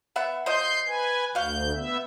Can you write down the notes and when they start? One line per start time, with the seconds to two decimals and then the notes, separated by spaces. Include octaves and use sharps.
0.16 B3 E5 F#5
0.46 F3 C5 D#5 C6 G6
0.87 B4 G#5
1.35 D2 F#4 F5 G6
1.75 B3 E5